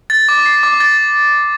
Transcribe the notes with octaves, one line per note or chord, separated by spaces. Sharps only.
A6
D6
C7
D6
A6